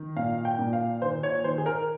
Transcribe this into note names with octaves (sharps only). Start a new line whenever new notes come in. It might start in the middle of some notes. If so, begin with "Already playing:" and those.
Already playing: D#3
A#2 F5
G5
A#2
F5
D#3 C5
C#5
D#3 C5
G#4
A#4